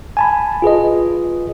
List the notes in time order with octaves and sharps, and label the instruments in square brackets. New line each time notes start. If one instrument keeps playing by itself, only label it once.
[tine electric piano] G#5 A5 B5
F4 G#4 B4 D#5